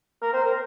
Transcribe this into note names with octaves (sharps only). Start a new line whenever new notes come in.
A#4
C5
A#4